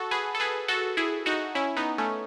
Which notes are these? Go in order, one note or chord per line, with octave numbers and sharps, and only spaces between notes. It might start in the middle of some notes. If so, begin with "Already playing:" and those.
Already playing: F#4 A4
G#4 B4
A4
G#4 B4
F#4 A4
E4 G#4
D#4 F#4
C#4 E4
B3 D#4
A3 C#4